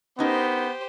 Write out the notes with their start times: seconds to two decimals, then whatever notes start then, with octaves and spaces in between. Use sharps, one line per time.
0.19 B3 C#4 D#4 G4 A#4 C5